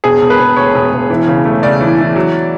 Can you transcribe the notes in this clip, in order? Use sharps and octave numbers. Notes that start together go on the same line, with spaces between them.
E1 G#4
E1
B4
E1
D2 C#5
E1
E1
E3
C#3
A3
C#3 D5
E3
E3
F#3